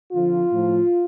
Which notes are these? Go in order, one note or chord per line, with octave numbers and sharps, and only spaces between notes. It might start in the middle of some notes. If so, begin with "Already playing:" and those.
F2 D3 F3 F4
A2 F3